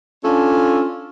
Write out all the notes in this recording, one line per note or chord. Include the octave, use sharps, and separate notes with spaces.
C#4 D4 F4 A4